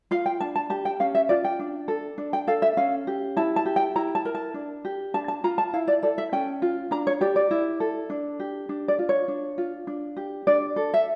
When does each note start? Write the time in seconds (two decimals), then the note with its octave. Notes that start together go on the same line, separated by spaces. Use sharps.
0.11 F4 F5
0.26 G5
0.40 D4 A5
0.56 A5
0.70 G4 A5
0.85 G5
1.00 C#4 F5
1.15 E5
1.29 F4 D5
1.44 G5
1.59 D4
1.88 A4
2.18 D4
2.33 G5
2.47 A4 F5
2.62 E5
2.77 C#4 F5
3.07 G4
3.37 E4 A5
3.56 A5
3.66 G4
3.76 G5
3.96 E4 A#5
4.15 A5
4.25 A#4
4.35 A5
4.54 D4
4.85 G4
5.14 D4 A5
5.28 A5
5.44 F4 A#5
5.58 A5
5.73 E4 F5
5.88 D5
6.03 A4 D5
6.18 E5
6.32 C#4 G5
6.62 F4
6.91 D4 A#5
7.07 C#5
7.21 G4 D5
7.36 D5
7.51 E4
7.80 A4
8.10 D4
8.40 G4
8.69 D4
8.88 D5
8.99 F4
9.09 C#5
9.28 D4
9.58 F4
9.87 D4
10.17 G4
10.47 D4 D5
10.76 A4
10.94 E5